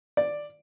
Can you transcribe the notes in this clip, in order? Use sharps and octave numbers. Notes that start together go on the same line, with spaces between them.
D5